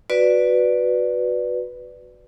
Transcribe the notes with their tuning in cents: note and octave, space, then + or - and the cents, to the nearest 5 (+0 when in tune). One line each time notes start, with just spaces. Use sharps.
F#4 -10 B4 +0 D5 +0